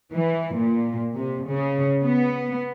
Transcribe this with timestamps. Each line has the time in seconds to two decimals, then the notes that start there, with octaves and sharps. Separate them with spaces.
0.14 E3
0.57 A#2
1.16 C3
1.48 C#3
2.02 B3